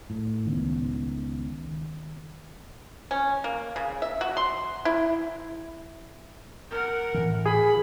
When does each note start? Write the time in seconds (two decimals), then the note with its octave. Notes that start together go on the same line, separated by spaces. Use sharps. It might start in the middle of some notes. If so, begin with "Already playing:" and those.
0.10 A2
0.46 C#2 D#3 B3
3.11 C#4
3.44 A#3
3.76 C#3
4.02 E5
4.21 F#4
4.37 C6
4.85 E4
6.70 A#4 F#5
7.14 A2 E3
7.46 G#4 B5